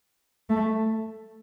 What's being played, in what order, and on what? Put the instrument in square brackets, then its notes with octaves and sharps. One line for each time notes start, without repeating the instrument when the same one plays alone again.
[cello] A3